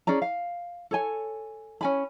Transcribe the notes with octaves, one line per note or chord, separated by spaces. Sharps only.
C#4 G#4 D5 A#5
F5
A4 C#5 G#5
C#4 G#5 B5